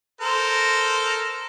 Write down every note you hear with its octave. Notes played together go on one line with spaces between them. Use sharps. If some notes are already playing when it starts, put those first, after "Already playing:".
A4 A#4 C5